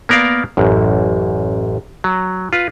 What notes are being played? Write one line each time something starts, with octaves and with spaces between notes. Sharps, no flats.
A#3 B3 A#4 D5 F5
A1 F#2
F#3
F4 B4